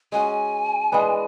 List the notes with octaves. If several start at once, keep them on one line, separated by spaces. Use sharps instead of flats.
G#3 C#4 F#4 G#5
E3 G#3 B3 D4